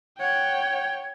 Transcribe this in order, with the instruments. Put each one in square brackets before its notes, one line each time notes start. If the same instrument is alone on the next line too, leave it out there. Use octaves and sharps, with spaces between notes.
[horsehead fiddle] C#5 [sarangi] F#5 [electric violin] G5